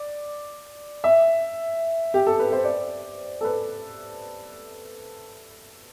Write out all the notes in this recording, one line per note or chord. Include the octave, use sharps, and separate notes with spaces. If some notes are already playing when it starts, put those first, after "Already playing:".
Already playing: D5
E5
G4
A4
B4
C5
D5
A4
B4